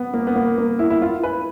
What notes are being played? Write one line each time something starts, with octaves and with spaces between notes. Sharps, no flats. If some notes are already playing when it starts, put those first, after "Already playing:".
Already playing: B3
A#3
B3
A#3
A#3
E4
E4
F4
B4